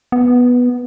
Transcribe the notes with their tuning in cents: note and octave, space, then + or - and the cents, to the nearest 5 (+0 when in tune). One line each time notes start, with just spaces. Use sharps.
B3 -5